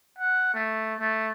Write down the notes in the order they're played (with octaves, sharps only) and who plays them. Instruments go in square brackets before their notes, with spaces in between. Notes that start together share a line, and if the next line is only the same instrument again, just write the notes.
[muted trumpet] F#5
A3
A3